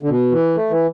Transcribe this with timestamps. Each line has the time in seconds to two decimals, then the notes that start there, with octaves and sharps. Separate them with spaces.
0.03 D3
0.09 B2
0.32 E3
0.56 A3
0.71 E3